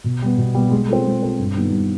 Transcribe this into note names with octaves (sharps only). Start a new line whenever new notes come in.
B2
G3 B3
B2
G3 B3
G#3
C4 F4 A4
G#3
C4 F4 A4
G2
D#3 G3 B3 D#4
G2